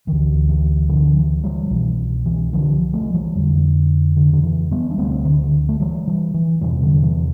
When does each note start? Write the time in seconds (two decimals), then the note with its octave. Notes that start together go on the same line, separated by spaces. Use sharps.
0.07 D2 D3 E3
0.49 E3
0.89 D3 F3
1.17 E3
1.44 E3 G3
1.66 F3
1.70 C2 B2 E3
2.26 E3
2.53 D3 F3
2.93 F3 A3
3.14 E3 G3
3.35 F2 D3
4.16 D3
4.33 D3
4.43 E3
4.71 G3 B3
4.91 D4
4.98 D2 C3 A3 C4
5.25 D3
5.43 D3
5.69 A3
5.80 E3 G3
6.08 E3
6.34 E3
6.61 E2 C3 E3 G3
6.82 D3
7.03 E3